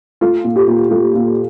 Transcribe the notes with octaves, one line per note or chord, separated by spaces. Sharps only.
A3 F4
A#2
G4
A#2
A3 F4
A#2